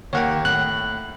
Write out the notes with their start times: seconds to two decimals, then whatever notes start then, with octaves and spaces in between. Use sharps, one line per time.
0.13 D#2 A#3 C#5 F#5 G5
0.45 A2 F#6